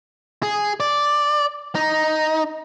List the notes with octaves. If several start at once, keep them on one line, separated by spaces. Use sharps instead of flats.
G#4
D5
D#4